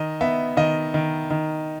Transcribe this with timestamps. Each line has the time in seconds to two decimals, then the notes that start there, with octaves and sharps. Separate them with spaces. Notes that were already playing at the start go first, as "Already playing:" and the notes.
Already playing: D#3 D#5
0.21 B3 E5
0.57 D#3 D#5
0.94 D#3
1.31 D#3